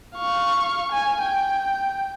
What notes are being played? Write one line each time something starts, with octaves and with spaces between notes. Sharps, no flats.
F5 C#6
G#5
G5